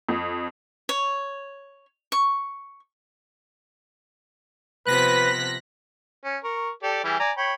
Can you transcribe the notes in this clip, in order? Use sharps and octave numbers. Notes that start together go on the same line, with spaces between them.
F2
C#5
C#6
C3 F3 B3 B4 F#6 A#6 B6
C#4
A#4 C#6
G4 A4 D5
E3 G3 G#4
D5 G#5 A#5
C#5 G5 B5